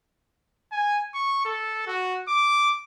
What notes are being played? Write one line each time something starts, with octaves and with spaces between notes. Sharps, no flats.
G#5
C#6
A4
F#4
D6